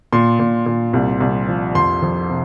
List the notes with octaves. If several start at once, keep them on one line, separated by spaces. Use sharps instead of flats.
A#2 C6
A#2
A#2
C2
C2
F3
F2 C6
F2
C3